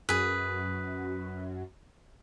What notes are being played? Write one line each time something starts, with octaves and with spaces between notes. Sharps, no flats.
F#2 G#4 B4